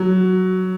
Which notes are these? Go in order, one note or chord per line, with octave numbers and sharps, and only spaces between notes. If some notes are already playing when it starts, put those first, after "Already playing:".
Already playing: F#3